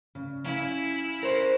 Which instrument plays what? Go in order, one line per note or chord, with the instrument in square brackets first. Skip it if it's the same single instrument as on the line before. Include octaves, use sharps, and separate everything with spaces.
[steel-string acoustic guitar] C#3
[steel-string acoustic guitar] C#4 F5 [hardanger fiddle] E4
[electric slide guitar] A#4 C5